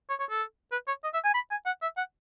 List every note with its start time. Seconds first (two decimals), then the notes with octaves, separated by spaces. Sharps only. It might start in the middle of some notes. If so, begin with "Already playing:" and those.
0.09 C#5
0.20 C#5
0.30 A4
0.72 B4
0.87 C#5
1.04 D#5
1.14 E5
1.24 G#5
1.34 B5
1.51 G#5
1.66 F#5
1.82 E5
1.97 F#5